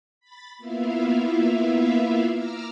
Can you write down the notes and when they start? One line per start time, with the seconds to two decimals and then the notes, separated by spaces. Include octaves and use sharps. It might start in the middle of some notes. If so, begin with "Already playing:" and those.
0.20 B5 A6
0.58 A#3 B3 E4 F4 E5 F5
2.26 A#5 D6 E6 F6